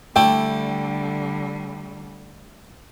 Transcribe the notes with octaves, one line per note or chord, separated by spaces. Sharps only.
D3 G3 A3 D4 E4 G5